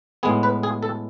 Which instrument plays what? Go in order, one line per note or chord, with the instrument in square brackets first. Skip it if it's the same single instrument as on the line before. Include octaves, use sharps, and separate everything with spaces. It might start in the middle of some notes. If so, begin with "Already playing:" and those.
[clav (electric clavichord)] A2 G#3 B3 G#4
B4
G#4
A4